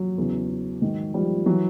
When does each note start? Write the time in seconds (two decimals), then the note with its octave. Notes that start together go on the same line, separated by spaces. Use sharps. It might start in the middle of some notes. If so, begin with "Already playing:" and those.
Already playing: F#3
0.18 E2 C#3 E3
0.82 G#2 D#3
1.14 F3 G3
1.46 E3 F#3